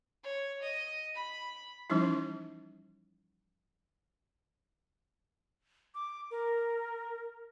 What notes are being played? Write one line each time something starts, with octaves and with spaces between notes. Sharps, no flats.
C#5
D#5
B5
E3 F3 G3 C#4 D#4 E4
D6
A#4